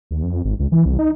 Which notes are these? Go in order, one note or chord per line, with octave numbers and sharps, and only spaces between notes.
D#2
F2
G#1
C#2
E3
C2
D#4